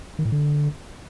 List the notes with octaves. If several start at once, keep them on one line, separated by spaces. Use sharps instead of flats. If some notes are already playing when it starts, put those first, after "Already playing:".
D#3
A2
D3